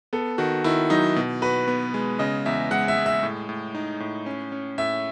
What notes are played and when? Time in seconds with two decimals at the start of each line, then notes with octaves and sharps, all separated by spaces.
0.13 B3 A4
0.38 D#3 F#4
0.64 D#3 E4
0.90 F#3 D#4
1.16 B2
1.42 F#4 B4
1.68 B3
1.94 G#3
2.19 C#3 D#5
2.46 E2 E5
2.71 G#3 F#5
2.88 E5
2.97 G#3
3.06 E5
3.23 A2
3.49 A2
3.75 D#4
4.00 A2
4.26 C#4
4.52 C#4
4.78 A2 E5